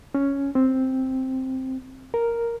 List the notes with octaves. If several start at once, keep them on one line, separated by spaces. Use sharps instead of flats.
C#4
C4
A#4